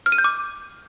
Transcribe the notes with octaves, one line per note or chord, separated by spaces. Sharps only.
F6
D#7
G6
D6